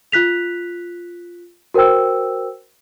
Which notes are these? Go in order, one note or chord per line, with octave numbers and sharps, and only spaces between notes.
F4 F#6 B6 F7
F#4 A#4 C5 G5 E6